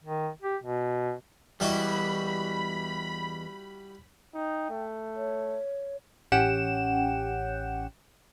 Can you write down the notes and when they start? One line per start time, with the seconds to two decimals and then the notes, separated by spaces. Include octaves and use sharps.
0.04 D#3
0.42 G4
0.64 B2
1.60 E2 G3 E4 F#4 D#5 B5
4.34 D#4 G5
4.70 A3
5.16 C#5
6.32 A1 C#4 G4 F#5 G5 E7